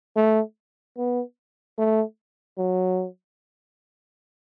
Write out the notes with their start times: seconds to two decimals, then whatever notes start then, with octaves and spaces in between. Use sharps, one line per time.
0.16 A3
0.97 B3
1.78 A3
2.58 F#3